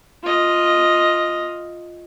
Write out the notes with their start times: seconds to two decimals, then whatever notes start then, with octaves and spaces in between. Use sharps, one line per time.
0.23 F4 D#5